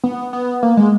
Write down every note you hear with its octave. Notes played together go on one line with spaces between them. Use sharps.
B3
B3
A#3
G#3